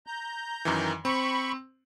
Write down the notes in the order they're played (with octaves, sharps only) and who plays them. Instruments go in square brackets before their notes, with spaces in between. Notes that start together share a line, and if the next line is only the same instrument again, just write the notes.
[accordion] A#5 G6
[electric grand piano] F#2 D#3 E3
[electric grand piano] C4 [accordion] B5 C#6